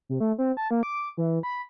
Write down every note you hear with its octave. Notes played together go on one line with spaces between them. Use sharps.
C3
A3
C4
A5
A#3
D6
E3
B5